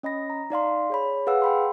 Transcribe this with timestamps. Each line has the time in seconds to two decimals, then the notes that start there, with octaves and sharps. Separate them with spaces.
0.03 C#4 D#5 B5 A#6
0.30 A#5
0.50 D#4 D5 F5 C6
0.90 G#4 C#5 B5
1.27 G#4 B4 F5 F#5 E6
1.42 G5 B5 C6